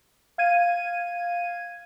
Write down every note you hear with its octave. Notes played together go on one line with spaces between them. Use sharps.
F5 G#6 D#7